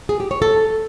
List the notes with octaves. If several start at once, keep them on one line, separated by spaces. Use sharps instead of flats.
G#4
G4
C#5
A4